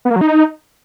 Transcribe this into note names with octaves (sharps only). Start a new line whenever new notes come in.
B3
A#3
F#3
D#4